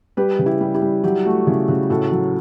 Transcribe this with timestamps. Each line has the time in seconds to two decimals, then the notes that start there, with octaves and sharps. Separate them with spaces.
0.17 G3 G4 B4
0.39 C#3
0.46 E4 G4
0.61 G3
0.75 E4 G4
0.82 G3
1.04 F#3 E4 G4
1.25 A3 F#4
1.47 C#3 E4
1.68 C#3 F#4
1.90 A2 F#4 A4
2.12 F#3